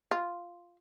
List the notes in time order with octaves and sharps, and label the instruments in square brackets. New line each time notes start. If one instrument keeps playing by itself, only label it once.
[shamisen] F4